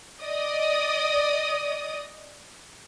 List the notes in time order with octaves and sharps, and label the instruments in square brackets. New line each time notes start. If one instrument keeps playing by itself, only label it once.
[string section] D5 D#5 D#6